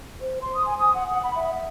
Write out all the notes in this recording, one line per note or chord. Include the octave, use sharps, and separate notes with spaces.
C5
C6
D#6
G#5
D#6
F#5
F#5
B5
E5
E5